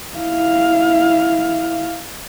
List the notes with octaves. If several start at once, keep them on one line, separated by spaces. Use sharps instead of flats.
E4 F5